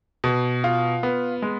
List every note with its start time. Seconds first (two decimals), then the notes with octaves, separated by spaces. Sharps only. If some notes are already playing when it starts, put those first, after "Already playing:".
0.24 B2
0.64 F4
1.03 B3
1.42 G#3